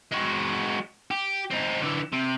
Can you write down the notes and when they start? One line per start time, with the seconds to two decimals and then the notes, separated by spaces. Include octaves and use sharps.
0.12 G#3 F#4
1.11 G4
1.51 C4 D#4
1.81 D3 E3
2.12 C3